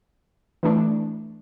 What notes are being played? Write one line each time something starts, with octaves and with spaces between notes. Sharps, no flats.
E3 A3 D4